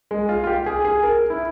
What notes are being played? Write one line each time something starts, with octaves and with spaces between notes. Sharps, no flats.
G#3
F4
F4
G4
G#4
G#4
A#4
E4